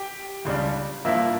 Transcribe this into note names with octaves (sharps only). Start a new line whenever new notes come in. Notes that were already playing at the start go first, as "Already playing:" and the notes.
Already playing: G4 G5
C#2 C#3 G3 D4
G2 F3 A#3 E4 E5